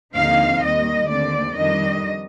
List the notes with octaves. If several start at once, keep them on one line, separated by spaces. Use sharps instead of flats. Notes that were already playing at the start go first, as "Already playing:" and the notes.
D#2 D3 F3 C4 D#4 F5
D#2 D#3 G3 D#5
D#2 D3 A3 C4 D5
F2 D#3 G3 D4 D#5